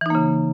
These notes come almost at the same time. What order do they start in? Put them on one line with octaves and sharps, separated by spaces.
E3 D#4 A#3 C#3